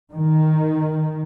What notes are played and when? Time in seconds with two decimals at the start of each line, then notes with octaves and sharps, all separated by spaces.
0.11 D#3